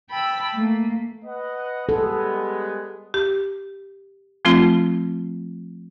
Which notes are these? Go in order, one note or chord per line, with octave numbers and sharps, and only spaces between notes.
G5 A5 B5 E6
A3 A#3
B4 D#5 F#5
G3 G#3 B3 A4
G4
F3 A3 C4 F4